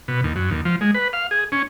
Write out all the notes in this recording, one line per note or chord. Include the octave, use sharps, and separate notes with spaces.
B2
D#2
F#2
D#2
F3
G#3
B4
F5
G#4
C#4